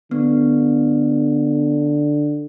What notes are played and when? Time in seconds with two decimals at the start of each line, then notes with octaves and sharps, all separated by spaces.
0.11 D3 B3